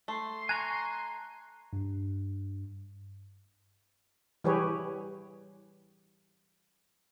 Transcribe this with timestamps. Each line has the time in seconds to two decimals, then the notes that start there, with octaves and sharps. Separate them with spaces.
0.08 A3 C6
0.49 G#5 A#5 C#6 F#6
1.73 G2
4.44 E3 G3 G4 G#4 B4 C#5